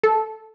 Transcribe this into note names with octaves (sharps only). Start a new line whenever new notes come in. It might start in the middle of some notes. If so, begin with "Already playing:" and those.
A4